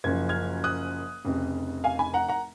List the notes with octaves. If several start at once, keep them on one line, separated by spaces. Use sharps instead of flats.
F#1 F#2 F3 G#6
F6 G#6
D#6 F#6
F1 F2 C#3
F5 G#5
G#5 B5
F#5 A#5
F#5 A#5